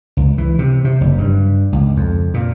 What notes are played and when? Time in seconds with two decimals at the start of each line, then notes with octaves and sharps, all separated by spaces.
0.17 C#2
0.38 E3
0.59 C3
0.84 C3
1.01 F#1
1.18 G2
1.72 C#2
1.96 F2
2.34 A#2